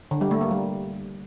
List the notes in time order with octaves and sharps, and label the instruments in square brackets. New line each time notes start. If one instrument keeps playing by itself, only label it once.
[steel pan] D3
G3
A3
A#3
G3